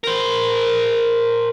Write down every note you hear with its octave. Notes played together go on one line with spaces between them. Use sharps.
A#4 C5